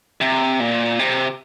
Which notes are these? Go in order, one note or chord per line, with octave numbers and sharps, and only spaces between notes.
C3
A#2
C3